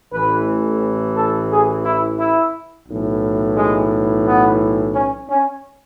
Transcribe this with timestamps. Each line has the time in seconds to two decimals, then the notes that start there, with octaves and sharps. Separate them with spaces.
0.13 A1 A2 E3 B4
1.17 A4
1.51 G#4
1.85 E4
2.19 E4
2.88 B1 A2 E3
3.56 G#3
4.26 B3
4.95 C#4
5.29 C#4